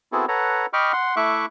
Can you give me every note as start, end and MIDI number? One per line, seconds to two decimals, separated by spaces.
0.12 0.26 59
0.12 0.26 60
0.12 0.26 64
0.12 0.26 66
0.12 0.26 68
0.12 0.26 69
0.28 0.66 69
0.28 0.66 71
0.28 0.66 73
0.28 0.66 78
0.28 0.66 82
0.73 0.92 75
0.73 0.92 79
0.73 0.92 83
0.73 0.92 85
0.73 0.92 86
0.73 0.92 89
0.93 1.15 78
0.93 1.15 84
1.16 1.46 57
1.16 1.46 64
1.16 1.46 76
1.16 1.46 85
1.16 1.46 86
1.16 1.46 90